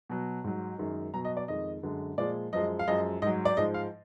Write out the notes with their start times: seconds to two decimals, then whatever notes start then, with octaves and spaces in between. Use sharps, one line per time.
0.10 B2 F#3
0.44 G#2 F#3
0.78 F#2 D#3 G#3
1.14 B2 F#3 A#5
1.25 D#5
1.37 D5
1.48 F2 D#3 G#3 D#5
1.83 F#2 D3 G#3
2.18 A#2 F3 G#3 D5
2.52 F#2 F3 G#3 D#5
2.79 F5
2.87 F#2 F3 G#3 D#5
3.22 G#2 F#3 D#5
3.45 D5
3.57 G#2 F3 G#3 D#5
3.74 F5